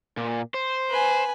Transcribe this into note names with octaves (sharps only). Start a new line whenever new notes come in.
A#2
C5
B4 G#5